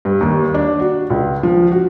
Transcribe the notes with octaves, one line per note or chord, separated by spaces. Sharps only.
G2
D#2
D4
F#4
C#2
F3
F#4